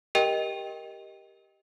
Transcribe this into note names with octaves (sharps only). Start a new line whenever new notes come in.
G4 A#4 D#5 G5